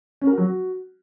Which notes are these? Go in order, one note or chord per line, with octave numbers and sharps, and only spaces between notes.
C#4
A#4
F#4
F#3
F#4